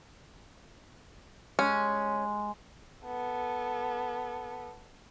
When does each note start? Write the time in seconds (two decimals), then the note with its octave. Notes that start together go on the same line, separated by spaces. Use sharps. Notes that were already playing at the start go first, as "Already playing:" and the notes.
1.59 G#3 C#4
3.05 B3 A4